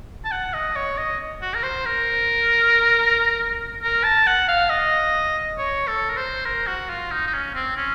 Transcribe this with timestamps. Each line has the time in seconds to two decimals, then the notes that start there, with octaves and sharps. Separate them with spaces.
0.25 A5
0.32 F#5
0.54 D#5
0.76 C#5
0.98 D#5
1.41 F#4
1.55 A#4
1.63 C5
1.85 A#4
3.83 A#4
4.04 A5
4.27 F#5
4.48 F5
4.70 D#5
5.58 C#5
5.87 A4
6.09 A#4
6.17 C5
6.45 A#4
6.67 F#4
6.90 F4
7.11 D#4
7.27 D#4
7.33 C#4
7.55 C4
7.77 C#4